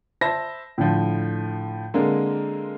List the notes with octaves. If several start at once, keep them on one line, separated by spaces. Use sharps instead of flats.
C5 E5 A5 B5 A#6
A2 D3 F3
D3 G#3 A#3 C4